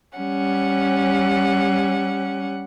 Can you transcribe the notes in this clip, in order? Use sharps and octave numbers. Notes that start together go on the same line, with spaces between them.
G3 C#4 F#5